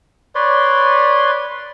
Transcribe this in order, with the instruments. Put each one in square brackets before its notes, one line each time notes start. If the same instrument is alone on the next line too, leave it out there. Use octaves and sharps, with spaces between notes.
[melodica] B4 C#5 D5 C6